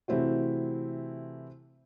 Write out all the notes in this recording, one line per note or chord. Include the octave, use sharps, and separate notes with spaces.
C3 E3 A3 C4 E4 F#4